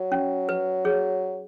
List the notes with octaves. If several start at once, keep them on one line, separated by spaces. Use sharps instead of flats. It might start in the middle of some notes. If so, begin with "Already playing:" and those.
Already playing: F#3
C#4
B4
G#4 C#5